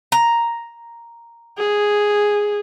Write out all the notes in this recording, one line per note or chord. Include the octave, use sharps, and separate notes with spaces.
A#5
G#4